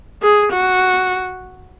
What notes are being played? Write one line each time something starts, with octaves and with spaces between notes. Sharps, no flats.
G#4
F#4